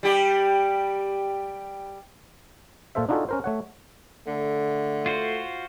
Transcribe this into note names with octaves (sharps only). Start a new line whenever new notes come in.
G3 G4
A#2 F4 A4 C5 E5
D4 D#4 F4 F#4 G#4 A4
C#4 A#4 C5
A3 C#5 F#5
D3 A3
F4 F#4 C5